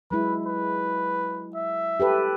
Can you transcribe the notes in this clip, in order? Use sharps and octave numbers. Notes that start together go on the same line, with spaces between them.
F#3 G#3 E4 B4
B4
E5
G4 A4 B4